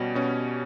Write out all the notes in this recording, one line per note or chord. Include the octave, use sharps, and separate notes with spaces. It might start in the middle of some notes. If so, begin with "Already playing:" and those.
Already playing: B2 G3 C#4
B2 C#4